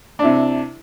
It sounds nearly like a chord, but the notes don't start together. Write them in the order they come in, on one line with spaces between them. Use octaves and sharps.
D4 E4 C3